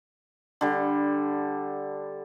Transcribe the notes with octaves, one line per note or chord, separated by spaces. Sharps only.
D3 G3